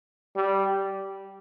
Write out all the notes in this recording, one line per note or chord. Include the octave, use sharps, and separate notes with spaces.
G3